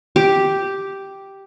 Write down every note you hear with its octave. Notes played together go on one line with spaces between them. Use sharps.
G4